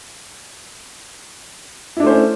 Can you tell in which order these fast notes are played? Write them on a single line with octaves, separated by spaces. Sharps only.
E4 D4 A3 C5 C#4